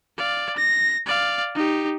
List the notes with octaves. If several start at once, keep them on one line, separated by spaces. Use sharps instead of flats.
D5 F5
A#6
D5 F5
D#4 G4